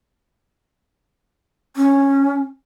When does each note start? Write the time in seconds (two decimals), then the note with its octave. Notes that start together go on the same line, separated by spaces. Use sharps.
1.76 C#4